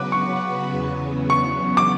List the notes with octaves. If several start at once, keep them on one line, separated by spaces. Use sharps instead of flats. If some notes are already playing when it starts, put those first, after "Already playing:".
Already playing: C#3 F#3 B3 F#4 B4 D6 F#6
C#6
E2 C#3 F#3 B3
C#6
D6